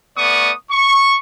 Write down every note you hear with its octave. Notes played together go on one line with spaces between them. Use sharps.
A3 B3 D5 C#6 D#6
C#6